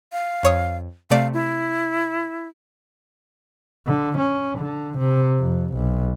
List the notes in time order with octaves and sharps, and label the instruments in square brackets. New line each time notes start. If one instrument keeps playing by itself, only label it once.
[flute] F5
[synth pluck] F2 C#5 D#6
[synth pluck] C3 A3 D5 [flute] F5
[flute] E4
[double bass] D3
C#4
D3
C3
F2
B1